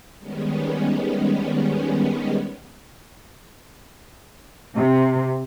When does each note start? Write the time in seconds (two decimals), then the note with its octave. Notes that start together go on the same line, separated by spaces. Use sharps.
0.20 D#3 G3 G#3 B3 C#4
4.76 C3